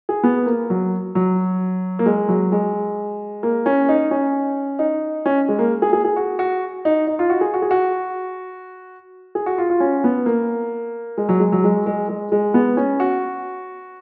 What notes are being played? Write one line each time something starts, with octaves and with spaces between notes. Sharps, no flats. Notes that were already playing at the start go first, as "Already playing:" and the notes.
G#4
B3
A#3
F#3
F#3
A#3
G#3
F#3
G#3
A#3
C#4
D#4
C#4
D#4
C#4
G#3
A#3
G#4
G#4
G#4
F#4
F#4
D#4
D#4
F4
F#4
G#4
F#4
G#4
F#4
G#4
F#4
F4
F4
C#4
B3
A#3
G#3
F#3
G#3
F#3
G#3
G#3
G#3
G#3
B3
C#4
F#4